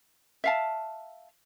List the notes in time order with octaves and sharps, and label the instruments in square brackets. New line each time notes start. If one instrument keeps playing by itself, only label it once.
[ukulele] E5 F5 A5